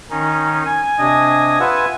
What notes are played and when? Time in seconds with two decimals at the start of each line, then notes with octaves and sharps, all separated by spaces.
0.10 D#3 C#4 D#4
0.65 G#5
0.99 C3 D4 D#5
1.60 F4 B4 E5 F#5